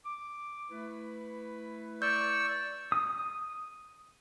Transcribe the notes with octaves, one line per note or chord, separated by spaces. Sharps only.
D6
A3 E4 B4
D5 C#6 E6 G6
D#6